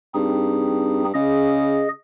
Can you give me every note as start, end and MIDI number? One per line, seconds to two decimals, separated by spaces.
0.15 1.12 43
0.15 1.05 60
0.15 1.05 63
0.15 1.05 68
1.14 1.88 49
1.14 1.89 68
1.14 1.89 75